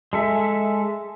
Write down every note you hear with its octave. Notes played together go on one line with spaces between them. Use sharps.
G#3 A4 E5